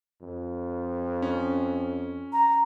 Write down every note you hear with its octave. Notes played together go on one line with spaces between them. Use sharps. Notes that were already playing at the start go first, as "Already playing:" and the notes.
F2
C#4
A#5